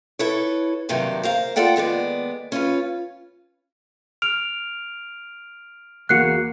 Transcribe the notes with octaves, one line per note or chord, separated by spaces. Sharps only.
E4 A4 B4 C#5
G2 C3 D#3 F#3
A#4 C5 F5
F4 A4 D5 F#5 G5
D#2 G#3 B3 D5
C#4 F4 B4
F6 D7 F7
E2 A#3 F#4 F#6 C7 C#7